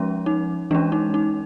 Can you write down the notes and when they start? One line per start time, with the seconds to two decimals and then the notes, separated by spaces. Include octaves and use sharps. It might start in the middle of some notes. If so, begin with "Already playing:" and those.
Already playing: F3 G#3 C#4
0.26 D#4
0.71 E3 G#3 C#4 D4
0.92 D#4
1.14 D#4